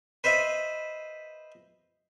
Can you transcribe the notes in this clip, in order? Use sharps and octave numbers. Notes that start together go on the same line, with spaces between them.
B4 C5 D#5 E5